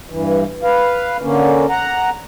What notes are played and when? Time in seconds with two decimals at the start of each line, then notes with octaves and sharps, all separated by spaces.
0.10 G2 E3
0.63 B4 F5
1.22 D3 A#3 C#4
1.69 F#5 A#5